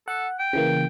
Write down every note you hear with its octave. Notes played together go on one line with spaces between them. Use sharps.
A4 F#5
G5
C#3 E3 A#3